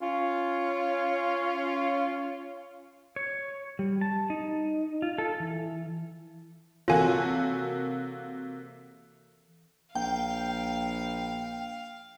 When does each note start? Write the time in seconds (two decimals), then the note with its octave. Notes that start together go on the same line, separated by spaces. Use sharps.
0.01 C#4 F4
3.16 C#5
3.79 G3
4.01 A5
4.30 D#4
5.02 F4
5.18 A4
5.40 E3
6.88 C3 E3 A#3 F4 F#4 A4 C#5 G#5
9.95 A#1 F5 G5